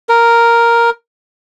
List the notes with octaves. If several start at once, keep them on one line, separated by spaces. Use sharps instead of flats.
A#4